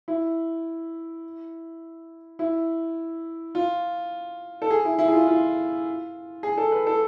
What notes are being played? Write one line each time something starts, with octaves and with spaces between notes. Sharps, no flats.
E4
E4
F4
A4
G#4
E4
E4
G#4
F4
F4
G#4
A4
B4
A4